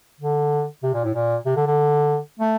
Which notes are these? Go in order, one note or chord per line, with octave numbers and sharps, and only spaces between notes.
D3
C3
A#2
A2
A#2
C3
D3
D3
A3